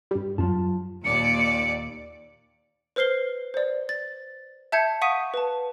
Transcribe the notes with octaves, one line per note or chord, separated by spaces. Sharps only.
G2 G3
F#2 F#3 F4 A5
D#2 A#2 D5 C#7
B4 C5 F6 C7 G7
C5 D5
A6
E5 A5 G6 G#6 C#7
F5 F#5 C#6 D#6 B6 D#7
B4 A5